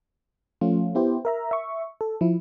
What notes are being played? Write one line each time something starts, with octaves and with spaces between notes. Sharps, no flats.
F3 A3 C#4 F4
B3 E4 G4 C5
A#4 E5 A#5
E5 C#6
A4
F3 E4